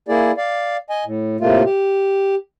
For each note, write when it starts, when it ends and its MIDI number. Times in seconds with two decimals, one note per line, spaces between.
0.08 0.32 58
0.08 0.32 64
0.08 0.32 68
0.08 0.32 74
0.37 0.77 74
0.37 0.77 77
0.90 1.04 75
0.90 1.04 80
1.05 1.37 45
1.40 1.63 45
1.40 1.63 48
1.40 1.63 57
1.40 1.63 58
1.40 1.63 65
1.66 2.35 67